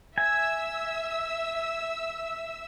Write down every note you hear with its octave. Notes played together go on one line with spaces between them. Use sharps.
E5 G#5 E6